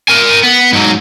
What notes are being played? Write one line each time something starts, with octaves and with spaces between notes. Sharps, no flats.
A#4 G#5
B3
G#2 F#3